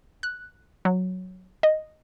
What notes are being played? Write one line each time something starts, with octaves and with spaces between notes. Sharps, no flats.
F#6
F#3
D#5